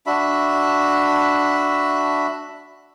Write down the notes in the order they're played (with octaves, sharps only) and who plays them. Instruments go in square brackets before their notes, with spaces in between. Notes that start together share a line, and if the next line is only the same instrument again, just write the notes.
[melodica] D4 F#4 E5 B5